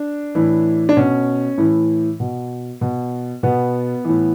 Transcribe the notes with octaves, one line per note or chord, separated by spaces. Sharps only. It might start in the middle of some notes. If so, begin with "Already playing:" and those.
Already playing: D4
A2 E3
D4
B2 C#4
A2 E3
B2
B2
B2 B3
A2 E3